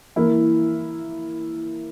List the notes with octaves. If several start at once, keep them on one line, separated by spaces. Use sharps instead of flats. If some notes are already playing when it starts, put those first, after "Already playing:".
E3 A#3 E4